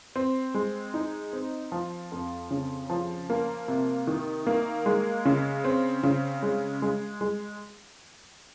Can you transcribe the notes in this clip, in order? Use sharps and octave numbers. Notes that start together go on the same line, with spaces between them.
C4
G#3
D#4
C4
F3
F2
C#3
F3
A#3
C3
D#3
A#3
G#3
C#3
C4
C#3
G#3
G#3
G#3